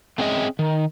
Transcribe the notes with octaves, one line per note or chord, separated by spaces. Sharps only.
A3 C4 C#4 G#4 D#5 E5
D#3